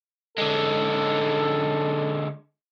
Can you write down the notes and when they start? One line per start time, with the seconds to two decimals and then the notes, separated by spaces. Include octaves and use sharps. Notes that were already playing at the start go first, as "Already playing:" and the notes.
0.38 D3 G#3 C#4 D#4 A4